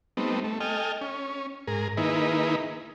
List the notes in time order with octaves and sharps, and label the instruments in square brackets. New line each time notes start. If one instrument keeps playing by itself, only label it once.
[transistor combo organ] G3 A3 B3 C4 D#4
A3
A4 D#5 G5 G#5 F6
C#4
G#2 G#4 A#4
D#3 A#3 D#4 E4 G#4 B4